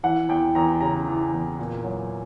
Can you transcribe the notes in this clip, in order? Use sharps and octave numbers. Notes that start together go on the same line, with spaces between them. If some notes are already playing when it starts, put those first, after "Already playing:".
E3 F#5
E2 G5
E2 A#5
C#3 A#5
E3
E2
A#2
F#3